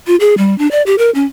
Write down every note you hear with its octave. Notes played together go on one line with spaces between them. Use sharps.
F4
G#4
G3
D4
D5
G4
A#4
C#4